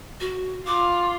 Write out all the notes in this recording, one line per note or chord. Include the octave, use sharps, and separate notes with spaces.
F#4
F4 D6